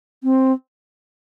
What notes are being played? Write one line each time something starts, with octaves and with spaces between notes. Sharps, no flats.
C4